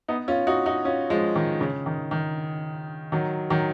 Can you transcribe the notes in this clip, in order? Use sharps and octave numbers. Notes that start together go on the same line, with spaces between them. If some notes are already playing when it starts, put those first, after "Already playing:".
B3 D#4
C#4 F4
D#4 F#4
D#4 F#4
C#4 F4
F3 G#3
D#3
C#3
D#3
D#3
D#3 F#3
D#3 F#3